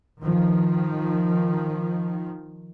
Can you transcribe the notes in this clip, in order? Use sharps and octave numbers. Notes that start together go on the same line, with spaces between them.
D#3 F3